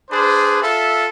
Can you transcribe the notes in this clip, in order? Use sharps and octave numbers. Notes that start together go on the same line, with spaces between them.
D4 G#4 B4 C5
F4 A4 E5